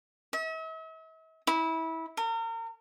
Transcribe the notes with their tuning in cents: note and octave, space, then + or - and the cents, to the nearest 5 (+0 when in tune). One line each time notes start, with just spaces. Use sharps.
E5 -45
E4 -25
A#4 -35